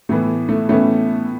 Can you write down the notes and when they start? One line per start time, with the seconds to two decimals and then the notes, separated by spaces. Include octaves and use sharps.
0.09 A2 E3 A3 B3
0.49 A3
0.69 A2 E3 A3 B3 C#4